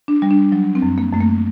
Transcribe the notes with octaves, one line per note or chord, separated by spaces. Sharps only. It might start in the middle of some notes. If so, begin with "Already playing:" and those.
D4
G3
D4
F#3
C4
F#2
A#3
F#2 A3
A#3